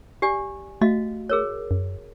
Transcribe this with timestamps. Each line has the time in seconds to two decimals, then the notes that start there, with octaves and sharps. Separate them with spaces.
0.22 G4 D5 G#5
0.82 A3 F#4 D#5 F5
1.29 G#4 A#4 C#5
1.71 F#2